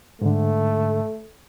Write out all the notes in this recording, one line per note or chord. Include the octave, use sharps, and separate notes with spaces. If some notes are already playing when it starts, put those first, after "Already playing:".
G#2 D3 A3